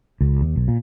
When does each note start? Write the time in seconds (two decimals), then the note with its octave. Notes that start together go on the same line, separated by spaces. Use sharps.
0.21 C#2
0.41 D#2
0.56 B1
0.68 A#2